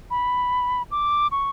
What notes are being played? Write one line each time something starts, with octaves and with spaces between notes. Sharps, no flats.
B5
D6
C#6